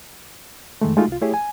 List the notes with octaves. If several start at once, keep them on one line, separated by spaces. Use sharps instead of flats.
F2 D#3 G#3 A3
G#3 A3 D#4 F4 F#4
C2 F4
A3 E4 G4 G#4 C#5
G#5